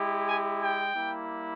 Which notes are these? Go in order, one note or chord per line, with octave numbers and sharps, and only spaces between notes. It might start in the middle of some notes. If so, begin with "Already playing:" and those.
Already playing: G#3 E4 G4
G#5
G5
G3 A#3 E4